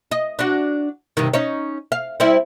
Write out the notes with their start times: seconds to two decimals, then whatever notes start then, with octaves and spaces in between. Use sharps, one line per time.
0.11 D#5
0.39 D4 F#4
1.17 G2 C3 D#3
1.34 C#4 D#4 C#5
1.92 F5
2.20 G3 C4 E4